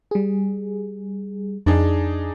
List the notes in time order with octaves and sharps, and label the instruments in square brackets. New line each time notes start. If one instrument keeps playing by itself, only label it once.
[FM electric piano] G3 G#4
[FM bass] F2 [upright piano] D4 D#4 G#4